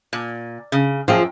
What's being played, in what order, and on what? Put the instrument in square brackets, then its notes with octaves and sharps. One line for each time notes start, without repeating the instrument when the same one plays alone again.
[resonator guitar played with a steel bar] A#2
C#3
[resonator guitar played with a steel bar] F#2 G5 [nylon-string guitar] F3 F4 G#4